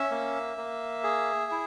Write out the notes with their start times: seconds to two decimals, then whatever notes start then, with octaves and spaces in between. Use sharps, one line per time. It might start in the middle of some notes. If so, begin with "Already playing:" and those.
Already playing: C#4 E5
0.11 A#3
0.57 A#3
1.03 G#4
1.51 E4